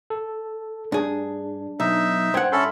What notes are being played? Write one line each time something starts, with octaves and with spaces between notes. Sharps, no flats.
A4
G2 D4 G#4
B1 D#4 E5
G2 C5 F#5 G5 G#6
C#4 A4 E5 B5 C6